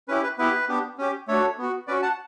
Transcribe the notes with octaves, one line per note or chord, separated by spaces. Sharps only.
C#4 E4 G4 B4
B4
B3 E4 G4 B4
B3 D4 G4
C#4 G4
A3 D4 F#4 A4 C#5
B3 F#4
C#4 F#4 B4 D5
F#5 A5